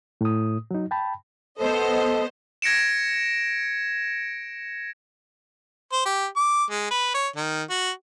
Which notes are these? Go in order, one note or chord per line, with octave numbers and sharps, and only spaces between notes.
A2 D#6
F#3 D#4
G5 A5 B5
B3 A4 C5 D#5
G#6 A#6 C#7 D7 E7
C5
G4
D6
G#3
B4
C#5
D#3
F#4